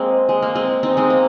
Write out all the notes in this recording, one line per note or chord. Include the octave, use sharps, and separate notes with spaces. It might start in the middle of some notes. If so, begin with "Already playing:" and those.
Already playing: G#3 A#3 C4
G#3
A#3
G#3 C4
C4 D#4
G#3 C4
A#3